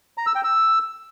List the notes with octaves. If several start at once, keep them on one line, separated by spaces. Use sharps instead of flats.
A#5
E6
G5
E6